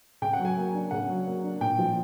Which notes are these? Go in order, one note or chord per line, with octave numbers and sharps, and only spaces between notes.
C#3 G5
F#5
F#3
G#5
A#3
D4
C#3 F#5
F#3
A#3
D4
A#2 G5
F3